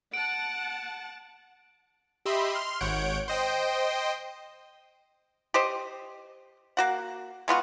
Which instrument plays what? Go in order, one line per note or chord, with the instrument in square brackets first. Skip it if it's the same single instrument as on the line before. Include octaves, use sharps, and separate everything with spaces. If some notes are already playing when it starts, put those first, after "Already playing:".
[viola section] F#5 A5 [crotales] D7
[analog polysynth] G4 D#5 E5 B5 C6
C6 F6
G#1 C#5 F#5 G6 D7
C5 D#5 G5
[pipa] G4 C5 D#5
A#3 F#4 F#5
G#3 B3 F4 F#4